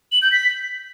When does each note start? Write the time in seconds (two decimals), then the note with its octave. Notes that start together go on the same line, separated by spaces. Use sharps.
0.12 F#7
0.22 G6
0.32 B6